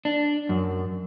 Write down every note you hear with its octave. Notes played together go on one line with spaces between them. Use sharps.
D4
F#2